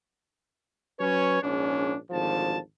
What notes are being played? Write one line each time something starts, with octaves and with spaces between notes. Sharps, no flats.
F#3 C#4 B4 C#5
A#1 G#2 C#4 D4
G#1 D2 F3 A5